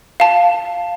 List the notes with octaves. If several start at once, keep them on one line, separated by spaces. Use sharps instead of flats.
F5 A5